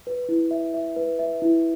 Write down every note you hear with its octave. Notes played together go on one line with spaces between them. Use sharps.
B4
E4
E5
E5
B4
E5
E4